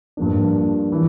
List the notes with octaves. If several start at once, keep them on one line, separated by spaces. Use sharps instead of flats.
G2 F3 A#3 D4
E3